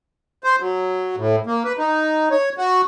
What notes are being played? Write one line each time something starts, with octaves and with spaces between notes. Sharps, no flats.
C5
F#3
A2
A#3
B4
D#4
C#5
F#4